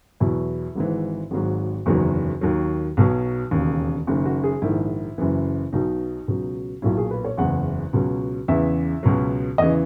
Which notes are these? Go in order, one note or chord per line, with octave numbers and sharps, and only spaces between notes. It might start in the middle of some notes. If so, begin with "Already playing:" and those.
E2 B2 F#3 E4
G#1 G#2 E3
G#1 G#2 F#3
F#1 E2 D#3 F#3
D#2 D#3 F#3
B1 B2 F#3
E1 D#2 C#3
F#1 F#2 D#3
F#4
G#4
A#1 G#2 D#3 E4
F#1 F#2 E3
B1 B2 F#3 D#4
C#2 B2 F#3
B1 A#2 F#3 E4
G#4
B4
C#5
F#1 E2 C#3 F#5
C#2 B2 F#3
E2 C#3 E3 E5
C#2 B2 F#3
E2 C#3 E3 D#5